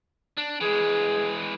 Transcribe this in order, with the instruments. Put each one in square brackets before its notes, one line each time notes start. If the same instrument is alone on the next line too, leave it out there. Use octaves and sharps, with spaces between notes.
[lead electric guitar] D4
[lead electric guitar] E3 G#3 [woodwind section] G#4